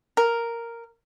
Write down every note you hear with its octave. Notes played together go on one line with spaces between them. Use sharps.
A#4